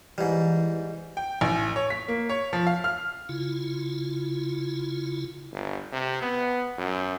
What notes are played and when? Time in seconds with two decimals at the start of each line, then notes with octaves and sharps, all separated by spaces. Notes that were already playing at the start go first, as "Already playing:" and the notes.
0.18 G#2 E3 G3
1.17 G5
1.41 A1
1.76 C#5
1.90 B6
2.08 A#3
2.30 C#5
2.53 F3
2.67 F5
2.84 F6
3.29 C#3 E4 F4
5.52 G1
5.92 C3
6.22 B3
6.78 F#2